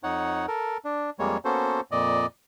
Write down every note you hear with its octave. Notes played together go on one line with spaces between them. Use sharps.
F2 D#4 C#5 F#5
A4 A#4
D4
F2 G3 G#3 A#3 C#5
A#3 B3 C#4 F#4 A4 C5
F2 A#2 D5 D#5